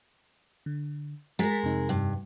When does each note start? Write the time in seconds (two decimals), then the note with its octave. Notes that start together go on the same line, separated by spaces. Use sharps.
0.66 D3
1.39 G#3 A#4 A#5 A6 B6
1.63 F2 C3 D#4
1.89 G2